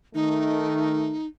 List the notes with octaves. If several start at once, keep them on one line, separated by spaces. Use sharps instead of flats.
D#3 A3 D#4 A#4